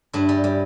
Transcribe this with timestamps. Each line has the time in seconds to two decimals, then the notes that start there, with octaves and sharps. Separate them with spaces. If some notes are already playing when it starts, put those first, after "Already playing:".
0.13 G2 E4
0.29 G3
0.44 G3